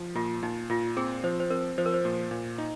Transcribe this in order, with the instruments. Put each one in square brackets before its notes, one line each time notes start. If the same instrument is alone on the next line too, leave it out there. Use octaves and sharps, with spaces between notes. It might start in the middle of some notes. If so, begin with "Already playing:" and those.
Already playing: [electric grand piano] F3
[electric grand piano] A#2 [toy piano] F4
[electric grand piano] A#2 [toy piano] D#4
[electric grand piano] A#2 [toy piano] F4
[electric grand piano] C4 [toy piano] G#4
[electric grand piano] F3 [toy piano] C5
[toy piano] C5
[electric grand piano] C4 [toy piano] A#4
[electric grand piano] F3 [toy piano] C5
[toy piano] A#4
C5
[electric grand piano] A#2
A#2
D#4